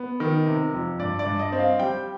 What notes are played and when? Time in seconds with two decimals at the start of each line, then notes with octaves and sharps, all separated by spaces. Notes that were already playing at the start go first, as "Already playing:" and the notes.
Already playing: B3
0.20 D#3
0.46 C3
0.73 F2
0.99 G2 D5
1.19 D5
1.26 G2
1.39 D#5
1.52 C4
1.59 F5
1.79 G3 G5